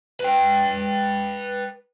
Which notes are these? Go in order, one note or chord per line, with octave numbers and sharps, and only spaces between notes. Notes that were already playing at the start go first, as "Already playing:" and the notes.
B4 G5